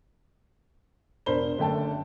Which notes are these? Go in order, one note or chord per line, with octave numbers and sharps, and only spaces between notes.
E1 D4 A#4 C5 B5 G7
F#1 D3 A3 G5 A5